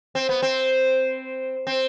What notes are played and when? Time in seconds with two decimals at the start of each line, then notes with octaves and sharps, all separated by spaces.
0.15 C4
0.29 B3
0.42 C4
1.67 C4